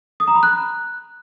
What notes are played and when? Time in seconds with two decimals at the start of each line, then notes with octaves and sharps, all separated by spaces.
0.20 D#6
0.28 A#5
0.35 B5
0.43 F#6